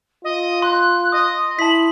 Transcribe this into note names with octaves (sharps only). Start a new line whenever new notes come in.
F4 D#5
C6 F#6
D#5 D#6
E4 A5 B6 F#7